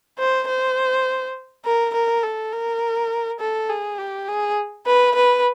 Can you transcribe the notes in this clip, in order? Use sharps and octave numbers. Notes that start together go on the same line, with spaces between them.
C5
C5
A#4
A#4
A4
A#4
A4
G#4
G4
G#4
B4
B4